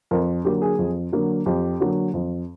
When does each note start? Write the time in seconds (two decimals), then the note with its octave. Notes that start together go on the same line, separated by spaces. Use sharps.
0.11 F2 A#4
0.44 D3 F#3 A#3 G4
0.62 G#4
0.79 F2
1.13 D3 F#3 A#3
1.46 F2 G4
1.80 D3 F#3 A#3
2.14 F2